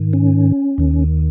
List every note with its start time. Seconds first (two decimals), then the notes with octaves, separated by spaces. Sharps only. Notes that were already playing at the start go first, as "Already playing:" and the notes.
Already playing: G#2 D#3
0.13 C#4
0.78 D#2 D#3